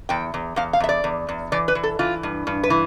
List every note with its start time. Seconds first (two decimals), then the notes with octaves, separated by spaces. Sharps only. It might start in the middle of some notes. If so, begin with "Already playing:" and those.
0.09 E2 G5
0.34 E2
0.56 E2 F5
0.73 F5
0.80 E2 E5
0.89 D5
1.04 E2
1.29 E2
1.52 E3 D5
1.68 B4
1.75 E3
1.83 A4
1.99 E3 F4
2.23 G2
2.47 G2
2.64 B4
2.70 E3